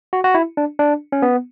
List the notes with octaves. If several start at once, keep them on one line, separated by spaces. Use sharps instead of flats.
F#4
F#4
E4
D4
D4
C#4
B3